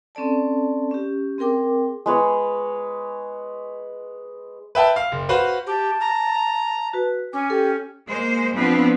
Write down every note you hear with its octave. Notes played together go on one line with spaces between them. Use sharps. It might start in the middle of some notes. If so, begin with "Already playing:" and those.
C4 C#4 A4 D5 A5
C#4 G4
C4 G#4 A#4 G5 D6
G#3 B4 C#5
B4 E5 G5 A5
F5
F#1
F#4 B4 C5 F5
G4 A5
A#5
F#4 B4
C#4 G#5 D6
G4 A4
G#3 A#3 C5
F3 B3 C4 D4 B4